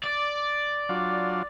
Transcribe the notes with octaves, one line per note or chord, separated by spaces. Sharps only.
D5
F#3 D4 F4